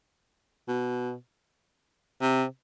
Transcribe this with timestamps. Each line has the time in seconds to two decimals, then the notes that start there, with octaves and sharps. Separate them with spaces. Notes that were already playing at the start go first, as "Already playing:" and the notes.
0.68 B2
2.21 C3